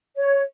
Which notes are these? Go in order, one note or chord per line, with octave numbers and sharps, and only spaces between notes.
C#5